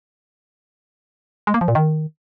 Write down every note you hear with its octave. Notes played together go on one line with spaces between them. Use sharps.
G#3
A#3
F3
A#2
D#3